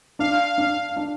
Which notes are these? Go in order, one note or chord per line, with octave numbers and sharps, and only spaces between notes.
D4 F5
D4
D4